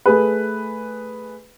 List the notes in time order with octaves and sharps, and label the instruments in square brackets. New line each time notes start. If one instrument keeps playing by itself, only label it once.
[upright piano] A3 G#4 B4